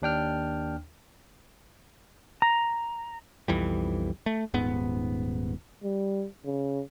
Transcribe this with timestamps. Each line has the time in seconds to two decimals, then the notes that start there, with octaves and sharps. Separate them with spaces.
0.02 D#2 D4 G5 F6
2.42 A#5
3.48 B1 F2 E3 G3
4.26 A3
4.54 D#1 G#2 B3
5.84 G3
6.45 C#3